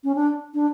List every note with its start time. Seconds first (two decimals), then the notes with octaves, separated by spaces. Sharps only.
0.04 C#4
0.15 D4
0.54 D4